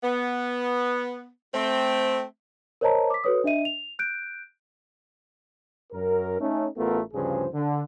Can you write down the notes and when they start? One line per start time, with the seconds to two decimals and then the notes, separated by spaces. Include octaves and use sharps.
0.04 B3
1.54 A3 C4
2.81 A#4 C5 C#5 D#5 A5 A#5
3.10 D6 B6
3.24 F#4 A4 B4 C#5 D#6
3.44 D4 D#5 E5 D#7
3.65 F7
3.99 F#6 G6 D7
5.92 F#2 A#4
6.40 A3 C#4 D#4
6.77 A1 A3 B3 F4 A4 A#4
7.13 D2 G2 C#3 F3 G#4 C5
7.53 D3